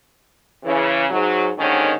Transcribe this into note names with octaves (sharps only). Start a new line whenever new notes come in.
C#3 E3
G#2 F#3
D#2 G#2 D3 D#3 C#4 C#5